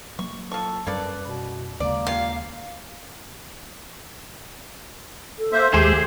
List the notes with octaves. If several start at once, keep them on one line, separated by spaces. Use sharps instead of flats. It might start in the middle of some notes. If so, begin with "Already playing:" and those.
F#3 A#3 C#6
F3 A4 C#6
F#2 G3 A#3 C#4 A4 B4 D5
B2
D#2 C#3 G#3 A#3 D5
C#4 F4 G4 F5
A4
A#3 C5 E5
D#2 G#3 G4 G#4 C5